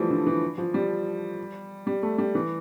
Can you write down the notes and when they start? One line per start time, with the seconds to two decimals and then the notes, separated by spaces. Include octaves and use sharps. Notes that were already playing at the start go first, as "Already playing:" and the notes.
Already playing: E3 F3 G3 A3
0.10 D3
0.26 E3
0.58 F3
0.74 G3
1.87 G3
2.03 A3
2.18 G3
2.35 E3